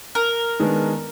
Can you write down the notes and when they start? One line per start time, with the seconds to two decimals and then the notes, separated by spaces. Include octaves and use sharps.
0.15 A#4
0.60 D#3 G#3 B3 D4